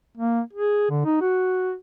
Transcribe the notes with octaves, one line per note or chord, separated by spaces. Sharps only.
A#3
G#4
D3
D#4
F#4